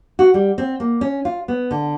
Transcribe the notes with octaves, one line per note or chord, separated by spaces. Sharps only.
F#4
G3
C4
A#3
C#4
F4
B3
D3